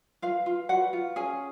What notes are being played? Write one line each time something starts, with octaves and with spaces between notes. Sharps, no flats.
F4 B4 F5
F4
F#4 B4 F#5
F4
C#4 G#4 G#5